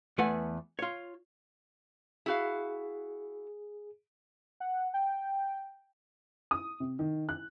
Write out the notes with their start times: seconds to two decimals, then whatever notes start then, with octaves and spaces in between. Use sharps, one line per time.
0.18 E2 A3 B4 F#5 G#5
0.79 F4 C#5
2.26 E4 F#4 G#4 F5
4.60 F#5
4.94 G5
6.51 D#6
6.80 C3
6.99 D#3
7.29 F#6